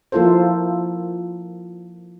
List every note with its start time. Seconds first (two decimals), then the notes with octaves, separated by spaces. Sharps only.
0.12 F3 A#3 E4 F4 A4 C5